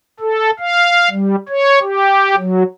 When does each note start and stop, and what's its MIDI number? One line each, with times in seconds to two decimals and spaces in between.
0.20 0.51 69
0.59 1.09 77
1.11 1.36 55
1.49 1.79 73
1.82 2.35 67
2.36 2.63 54